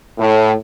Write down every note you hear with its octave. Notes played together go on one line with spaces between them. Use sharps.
A2